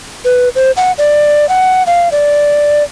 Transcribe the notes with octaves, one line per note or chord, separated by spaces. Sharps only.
B4
C5
F#5
D5
F#5
F5
D5